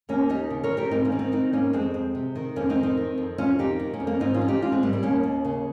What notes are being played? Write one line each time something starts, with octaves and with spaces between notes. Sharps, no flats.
D#2 A#3 C#4
D#2 D#4 G4
C#3
A#4 C#5
F3
G4 A#4
G#2 C4 D#4
A#3 C#4
D#3
C4 D#4
D#3 C4 D#4
G#2 A#3 C#4
F2 G#3 C4
F2
C3
D#3
F2 A#3 C#4
C4 D#4
D#3
C4 D#4
D#3
F2
F2 C#4 F4
D#3 D#4 G4
D#3
A#3 C#4
F2
A#3 C#4
G#2 C4 D#4
C#4 F4
F3
D#4 G4
F3 C#4 F4
G#3 C4
G#2 G3 A#3
G3 A#3
D#2 A#3 C#4
D#2
C#3